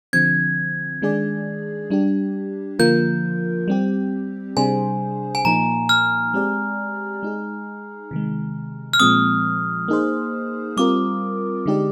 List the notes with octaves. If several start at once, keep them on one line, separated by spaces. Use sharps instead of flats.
D3 F3 C4 G#6
D#3 G#3 D4 G#4 D5
G3 D4 G4
D3 F3 A#3 F4 A#4 G6
G3 C4 G4
C3 G3 D4 G#4 C5 G#5
G#5
A#2 F3 A#3 D#4 A#5
F6
G#3 C4 G4 D5
G#3 D#4 G#4
C3 D#3 G#3
F6
A#2 F3 G#3 C4 D#6
A#3 D#4 G#4 C5
G3 C4 F4 A#4 D6
D3 G#3 D#4 G4 D5